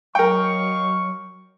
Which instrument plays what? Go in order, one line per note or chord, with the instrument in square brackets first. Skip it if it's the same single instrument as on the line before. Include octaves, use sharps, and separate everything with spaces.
[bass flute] F#3 [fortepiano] A#4 G5 [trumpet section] D#5 F5 C#6